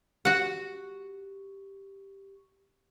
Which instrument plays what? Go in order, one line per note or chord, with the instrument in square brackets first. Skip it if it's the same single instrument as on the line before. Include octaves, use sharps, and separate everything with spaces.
[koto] F#4 F#5 [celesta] G4 C#6